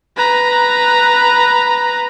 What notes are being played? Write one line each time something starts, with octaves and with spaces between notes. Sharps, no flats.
B4 A#5